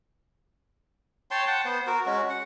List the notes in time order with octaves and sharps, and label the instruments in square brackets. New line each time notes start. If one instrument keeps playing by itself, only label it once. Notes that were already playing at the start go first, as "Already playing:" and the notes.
[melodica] C#5 G5 A5 C6
F#5 G5 A5
B3 C5
F#4 A#4
G#3 C#4 F#4
F#5